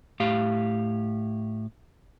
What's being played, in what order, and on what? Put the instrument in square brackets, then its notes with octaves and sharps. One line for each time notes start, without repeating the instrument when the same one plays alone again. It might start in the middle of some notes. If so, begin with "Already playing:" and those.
[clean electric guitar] A2 G4 F5